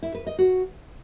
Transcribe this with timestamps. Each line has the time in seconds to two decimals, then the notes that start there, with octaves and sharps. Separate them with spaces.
0.03 E4
0.15 B4
0.27 D#5
0.39 F#4